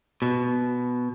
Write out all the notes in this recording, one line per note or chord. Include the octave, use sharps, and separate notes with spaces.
B2